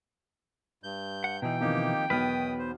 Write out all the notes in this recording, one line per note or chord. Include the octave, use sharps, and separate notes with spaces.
G2 G6
F#5
B2 E3 D#4 G5
D#3 F3 A#3 C4 D#4 G4
B1 E2 D#3 B3 B4 D#6 F6
C5